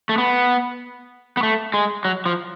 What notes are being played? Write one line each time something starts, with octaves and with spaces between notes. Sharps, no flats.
A3
B3
B3
A3
G#3
F#3
F3